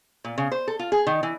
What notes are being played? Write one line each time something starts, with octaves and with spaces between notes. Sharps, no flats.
A#2
C#3
C5
A4
F4
G#4
D#3
E3